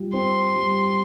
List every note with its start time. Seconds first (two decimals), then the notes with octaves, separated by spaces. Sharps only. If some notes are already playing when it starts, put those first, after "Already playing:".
Already playing: G3 F4
0.13 C4 C6
0.56 G3